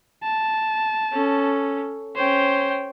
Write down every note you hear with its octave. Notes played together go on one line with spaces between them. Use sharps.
A5
C#4 A4
C#4 C5 C#5 G5